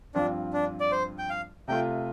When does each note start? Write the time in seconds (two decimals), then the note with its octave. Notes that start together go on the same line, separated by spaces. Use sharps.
0.15 G2 F3 C4 D4 F4
0.53 D4
0.80 D5
0.92 C5
1.18 G5
1.30 F5
1.68 C3 A3 F4 G5